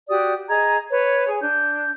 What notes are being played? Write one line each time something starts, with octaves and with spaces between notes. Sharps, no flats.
F#4 G4 D5 D#6
G#4 D#5 A#5 G#6
B4 C#5
G#4 G#5
D4 G6